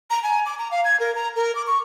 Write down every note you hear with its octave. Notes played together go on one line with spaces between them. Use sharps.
A#5
G#5
D6
A#5
F5
G#6
A#4
A#5
A#4
D6
C#6